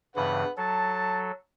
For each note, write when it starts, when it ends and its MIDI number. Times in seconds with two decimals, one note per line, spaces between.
0.16 0.44 43
0.16 0.44 49
0.16 0.44 52
0.16 0.50 71
0.16 0.50 78
0.57 1.32 54
0.57 1.32 69
0.57 1.20 81